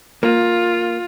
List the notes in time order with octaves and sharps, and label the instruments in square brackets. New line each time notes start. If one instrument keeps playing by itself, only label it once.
[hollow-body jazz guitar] A#3 [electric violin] F4